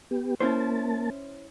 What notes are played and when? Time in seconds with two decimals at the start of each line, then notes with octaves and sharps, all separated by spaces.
0.11 B3 G4
0.40 A#3 C#4 E4 C5 A5